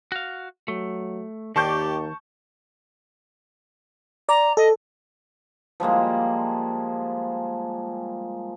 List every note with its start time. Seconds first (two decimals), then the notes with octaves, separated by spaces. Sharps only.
0.12 F#4 F5
0.68 F#3 A3
1.56 D#2 D#3 G4 D5 A5 C#6 G6
4.29 D5 A#5
4.57 A4 D#5
5.80 F3 G3 G#3 A#3